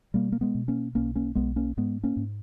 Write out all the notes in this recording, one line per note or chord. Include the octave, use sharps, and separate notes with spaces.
B2 G3 A#3
A#3
G#3 B3
B2
A#3 C#4
B1 A#3 C#4
A#3 C#4
B1 G#3 B3
A#3 C#4
G#2 G#3 B3
A#3 C#4
G#2